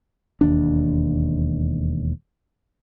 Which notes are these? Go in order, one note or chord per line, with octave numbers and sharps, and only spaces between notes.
E1 D#2 D4